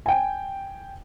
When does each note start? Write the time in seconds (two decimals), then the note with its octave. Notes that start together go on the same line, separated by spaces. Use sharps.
0.06 G5 G#5